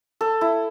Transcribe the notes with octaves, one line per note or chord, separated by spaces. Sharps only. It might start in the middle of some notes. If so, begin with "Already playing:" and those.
A4
E4